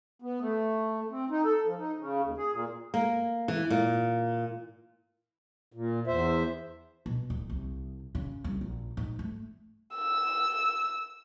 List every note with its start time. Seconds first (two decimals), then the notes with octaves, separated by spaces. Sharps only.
0.22 B3
0.41 A3
1.10 C4
1.30 D#4
1.45 A4
1.66 F3
1.79 D#4
1.98 C#3
2.23 D#2
2.38 G#4
2.52 A#2
2.94 A#3
3.48 E3
3.70 A#2
5.73 A#2
6.07 E2 C5 E5
7.06 B2
7.30 D1
7.50 C2
8.15 C#3
8.44 C2
8.61 A#1
8.97 G#2
9.19 A3
9.96 E6